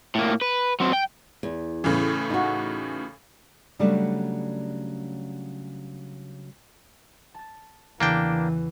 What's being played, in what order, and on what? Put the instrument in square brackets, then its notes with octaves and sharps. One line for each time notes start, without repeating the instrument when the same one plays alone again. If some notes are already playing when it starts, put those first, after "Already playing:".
[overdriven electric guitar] A2 A#3
B4
F#3 C4
G5
[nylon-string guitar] E2
[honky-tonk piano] A2 C#3 E3
[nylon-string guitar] D#4 F#4
C#3 F#3 G3 A3 D4
[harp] A5 A6
[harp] E2 C#3 [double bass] E3 [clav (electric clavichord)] A#3 D4 G5